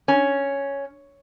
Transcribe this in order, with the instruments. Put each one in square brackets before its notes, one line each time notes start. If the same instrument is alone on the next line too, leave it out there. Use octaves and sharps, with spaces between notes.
[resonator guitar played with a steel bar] C#4